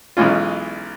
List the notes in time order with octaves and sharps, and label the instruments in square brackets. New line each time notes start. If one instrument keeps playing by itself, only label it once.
[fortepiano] B1 E3 G#3 C#4 F4